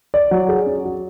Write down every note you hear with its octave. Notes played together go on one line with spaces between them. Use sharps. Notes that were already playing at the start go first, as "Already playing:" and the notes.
D5
F#3
G#4
C#4
F#4